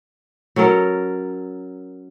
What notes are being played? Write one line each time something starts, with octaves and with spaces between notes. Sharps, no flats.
F#3 C#4 A4 A#4